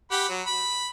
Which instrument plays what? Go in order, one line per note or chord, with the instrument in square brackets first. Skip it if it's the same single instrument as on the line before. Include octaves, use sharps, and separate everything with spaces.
[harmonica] G4 F#5 B5
F#3
B5